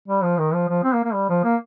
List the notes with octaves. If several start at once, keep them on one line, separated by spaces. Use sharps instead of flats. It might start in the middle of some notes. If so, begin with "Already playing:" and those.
G3
F3
D#3
F3
F3
C4
A#3
A#3
G3
F3
A#3